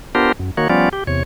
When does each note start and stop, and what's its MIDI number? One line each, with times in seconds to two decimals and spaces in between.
0.15 0.32 59
0.15 0.32 62
0.15 0.32 65
0.15 0.32 67
0.15 0.32 70
0.15 0.32 72
0.39 0.51 42
0.57 0.68 51
0.57 0.68 58
0.57 0.68 66
0.57 0.68 73
0.69 0.89 53
0.69 0.89 55
0.69 0.89 59
0.69 0.89 61
0.69 0.89 65
0.69 0.89 74
0.93 1.04 67
1.07 1.23 40
1.07 1.23 48
1.07 1.23 73